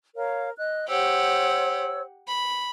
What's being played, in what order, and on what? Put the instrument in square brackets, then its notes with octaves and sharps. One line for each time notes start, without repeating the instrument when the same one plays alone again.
[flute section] A#4 C#5 F5
D#5 F#6
[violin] G4 F#5 [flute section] C5 C#5 E6
[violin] B5